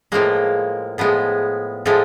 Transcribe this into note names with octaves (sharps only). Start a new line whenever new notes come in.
A2 F3 G#3 A#3
A2 F3 G#3 B3
A2 F3 G#3 A3